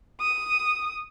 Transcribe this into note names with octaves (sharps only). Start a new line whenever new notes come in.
D#6